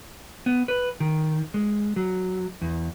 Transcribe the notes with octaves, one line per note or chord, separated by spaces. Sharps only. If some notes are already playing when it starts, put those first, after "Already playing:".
B3
B4
D#3
G#3
F#3
E2